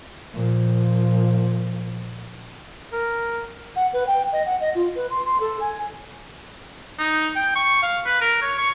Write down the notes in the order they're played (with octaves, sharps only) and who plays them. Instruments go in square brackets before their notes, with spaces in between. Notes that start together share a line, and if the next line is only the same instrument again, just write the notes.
[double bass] A#2 F3
[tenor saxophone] A#4
[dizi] F#5
B4
G5
D#5
F#5
D#5
F4
B4
C6
C6
A4
G#5
[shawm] D#4
G5
C#6
F5
B4
A#4
C#5
C#6